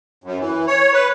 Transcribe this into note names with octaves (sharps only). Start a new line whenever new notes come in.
F#2
E3
C#5
B4